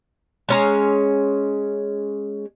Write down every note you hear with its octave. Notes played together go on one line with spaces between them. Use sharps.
G#3 C#4 A#5